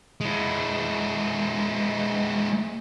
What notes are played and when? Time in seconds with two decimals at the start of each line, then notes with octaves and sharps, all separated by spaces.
0.21 G#3 E4